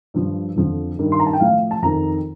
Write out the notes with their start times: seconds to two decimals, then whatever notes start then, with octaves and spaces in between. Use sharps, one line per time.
0.14 G2 F3
0.56 F2 D3 F3
0.99 G2 D#3
1.12 C6
1.20 A#5
1.26 A5
1.33 G5
1.40 A2 F3 F5
1.71 A5
1.82 F2 D#3 A#5